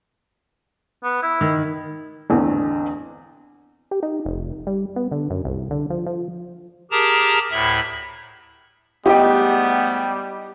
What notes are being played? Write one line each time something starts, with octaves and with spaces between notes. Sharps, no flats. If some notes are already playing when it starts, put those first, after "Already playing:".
B3
E4
D#3
A1 E2 D3 C4
G4
D#4
F1
G3
B3
D3
F#2
C2
D3
F3
F3
G4 G#4 A#4 A5 A#5
D2 A2 E5 B5
G#2 G3 A3 B3 G4 D#5 G5